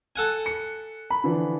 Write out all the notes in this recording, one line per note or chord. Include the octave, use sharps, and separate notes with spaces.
A4 F#5 G#5
C#7
B5
D3 E3 F3